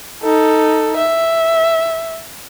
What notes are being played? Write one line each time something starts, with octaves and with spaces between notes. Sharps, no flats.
D#4 A4
E5